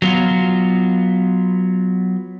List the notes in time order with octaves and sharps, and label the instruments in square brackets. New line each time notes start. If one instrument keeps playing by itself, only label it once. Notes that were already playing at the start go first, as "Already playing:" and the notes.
[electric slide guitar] F#3 B3 F4